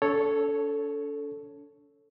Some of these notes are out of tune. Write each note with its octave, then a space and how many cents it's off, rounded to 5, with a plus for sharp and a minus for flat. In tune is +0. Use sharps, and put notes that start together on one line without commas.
D4 -45 A4 +0 C#5 +0